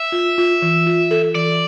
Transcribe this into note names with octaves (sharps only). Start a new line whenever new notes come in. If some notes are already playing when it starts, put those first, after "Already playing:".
Already playing: E5
F4
F4
E3
F4
A4
E3 D5